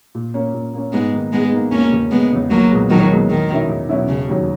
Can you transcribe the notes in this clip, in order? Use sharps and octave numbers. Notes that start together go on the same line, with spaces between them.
A#2
A#3 C#4
A#2
A#3 C#4
G#2 G#3 B3
D#3 A#3
G#2 G#3 B3
D#3 A#3
E1 A#3 C#4
E2 C#3
E1 G#3 B3
E2 C#3
B1 F#3 A#3
A#2 G#3 B3
B1 D#3 F#3
A#2 G#3 B3
E2 D#3
B2 F#3 C#4 E4
E2
B2 F#3 C#4 E4
E1 C#3
D#2 D#3 F#3 C#4